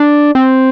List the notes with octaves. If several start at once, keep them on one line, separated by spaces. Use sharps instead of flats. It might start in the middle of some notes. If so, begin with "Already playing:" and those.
Already playing: D4
C4